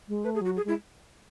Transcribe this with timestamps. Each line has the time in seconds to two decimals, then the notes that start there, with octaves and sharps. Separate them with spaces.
0.08 G#3
0.24 A3 B4
0.35 G#4
0.41 F#3 F#4
0.56 G#4
0.65 G#3 E4